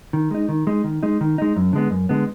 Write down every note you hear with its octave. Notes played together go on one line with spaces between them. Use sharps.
D#3
G#3 D#4
D#3
G#3 D#4
D#3
G#3 D#4
D#3
G#3 D#4
F#2
D3 G#3 B3
F#2
D3 G#3 B3